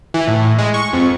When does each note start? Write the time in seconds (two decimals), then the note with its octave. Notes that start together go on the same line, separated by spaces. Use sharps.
0.14 E3
0.28 A2
0.58 G#3
0.74 C#6
0.93 F2